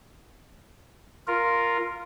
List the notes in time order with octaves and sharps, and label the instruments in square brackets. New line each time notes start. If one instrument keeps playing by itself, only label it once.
[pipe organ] F4 A#4